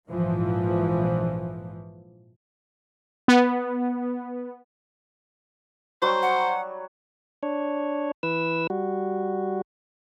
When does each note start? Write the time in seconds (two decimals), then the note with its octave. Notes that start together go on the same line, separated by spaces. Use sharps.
0.11 A#1 G#2 E3 F3
3.28 B3
6.02 F#3 G3 C5 C#6
6.22 F#5
7.43 D4 C#5
8.23 E3 B4 E6
8.70 G3 F#4